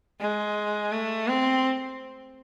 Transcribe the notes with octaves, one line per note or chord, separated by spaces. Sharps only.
G#3
A3
C4